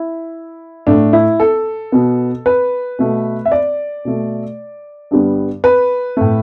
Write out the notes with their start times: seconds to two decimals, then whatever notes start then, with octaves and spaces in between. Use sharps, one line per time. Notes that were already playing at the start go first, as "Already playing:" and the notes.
Already playing: E4
0.87 A2 A3 D4
1.13 E4
1.40 A4
1.92 B2 B3
2.46 B4
2.99 B2 A3
3.46 E5
3.52 D5
4.05 B2 A3
5.11 G2 D3 G3 B3
5.64 B4
6.17 A2 A3